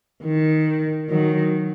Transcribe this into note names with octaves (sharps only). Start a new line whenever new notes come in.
D#3
D#3 F#3